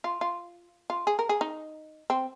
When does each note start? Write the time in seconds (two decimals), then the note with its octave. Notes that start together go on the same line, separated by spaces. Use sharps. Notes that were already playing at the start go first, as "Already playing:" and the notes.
0.04 F4
0.21 F4
0.90 F4
1.07 G#4
1.19 A#4
1.29 G#4
1.41 D#4
2.10 C4